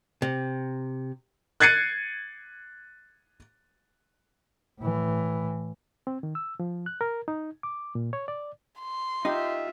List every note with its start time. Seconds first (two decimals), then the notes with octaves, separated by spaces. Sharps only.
0.22 C3
1.60 F#6 G#6 A6 C7 C#7 D#7
4.79 A2 E3
6.07 C4
6.23 D#3
6.35 E6
6.60 F3
6.86 F#6
7.01 A#4
7.28 D#4
7.63 D6
7.95 A#2
8.13 C#5
8.28 D5
8.80 C6
9.25 D#4 F4 G4 E5